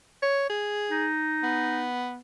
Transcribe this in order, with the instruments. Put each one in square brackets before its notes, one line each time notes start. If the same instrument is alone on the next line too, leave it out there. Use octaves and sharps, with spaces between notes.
[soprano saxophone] C#5
G#4
[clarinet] D#4
[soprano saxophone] B3